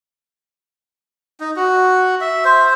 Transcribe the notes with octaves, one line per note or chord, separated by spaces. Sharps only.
D#4
F#4
E5
C5